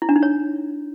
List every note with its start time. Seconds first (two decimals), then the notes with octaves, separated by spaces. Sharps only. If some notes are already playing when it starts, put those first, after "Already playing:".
0.02 E4
0.09 D4
0.16 D#4
0.23 C#5